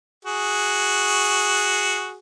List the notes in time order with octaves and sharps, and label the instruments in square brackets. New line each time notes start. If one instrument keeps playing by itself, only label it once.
[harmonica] F#4 G#4